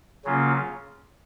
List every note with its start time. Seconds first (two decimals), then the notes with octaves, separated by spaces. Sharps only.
0.25 C#3 F#3 A#3 C#4 F4